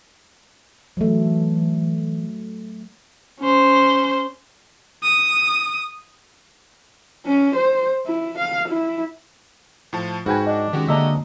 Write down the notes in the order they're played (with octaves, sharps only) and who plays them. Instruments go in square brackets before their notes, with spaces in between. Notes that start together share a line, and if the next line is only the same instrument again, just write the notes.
[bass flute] E3 [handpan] F#3 A3
[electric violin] C#4 C5
D#6
[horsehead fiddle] C#4
C5
E4
F5
E4
[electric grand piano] A2 F3 A5
[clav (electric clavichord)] G#2 G5 G#5 [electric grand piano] F#4 [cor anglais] B4
[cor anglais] D4 [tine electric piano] D#5
[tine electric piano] D#3 C#4 [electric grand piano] G#3 F#4 G4
[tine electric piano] D3 A#3 A#5 [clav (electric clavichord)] D4 E5 [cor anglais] D#5